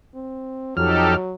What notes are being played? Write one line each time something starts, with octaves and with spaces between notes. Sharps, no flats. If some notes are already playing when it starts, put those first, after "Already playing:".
C4
F2 F#3 D#4 G4 A4 F6